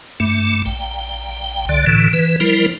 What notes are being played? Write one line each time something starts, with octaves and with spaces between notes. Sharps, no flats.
G2 A3
A#1 G5
C2 D3 D5
A2 D3 E3
E3 B4
F3 G3 E4 A#4